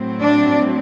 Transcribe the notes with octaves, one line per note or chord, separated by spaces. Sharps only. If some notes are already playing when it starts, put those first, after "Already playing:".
Already playing: A2 F#3 C4
D4 D5